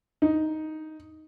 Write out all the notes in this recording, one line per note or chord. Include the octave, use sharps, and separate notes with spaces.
D#4